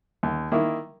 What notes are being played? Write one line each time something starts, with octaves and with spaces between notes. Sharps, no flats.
D#2
D#3 A#3 E4